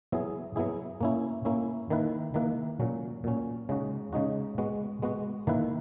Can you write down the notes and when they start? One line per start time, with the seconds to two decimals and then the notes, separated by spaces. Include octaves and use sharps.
0.12 F#3 B3 E4 G#4
0.56 F#3 B3 E4 G#4
1.01 A#3 C#4 E4
1.45 A#3 C#4 E4
1.90 D#3 A#3 E4 B4
2.34 D#3 A#3 E4 B4
2.80 A#2 F#3 C#4
3.24 A#2 F#3 C#4
3.69 C#3 G#3 D#4 F#4
4.13 C#3 G#3 D#4 F#4
4.58 G#3 B3 F#4
5.02 G#3 B3 F#4
5.47 D#3 A#3 E4 B4